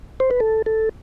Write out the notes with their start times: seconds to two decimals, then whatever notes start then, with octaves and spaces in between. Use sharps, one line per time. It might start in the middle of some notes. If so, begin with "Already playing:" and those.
0.20 C5
0.31 B4
0.40 A4
0.66 A4